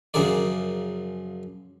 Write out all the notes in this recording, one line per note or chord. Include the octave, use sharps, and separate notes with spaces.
F#2 C#3 F3 G#4 A#4 D5